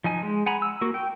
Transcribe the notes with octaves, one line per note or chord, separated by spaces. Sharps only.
F3 D#4 G#5
G#3
F#5 G#5 A#5 B5
E6
A#3 F#4
G5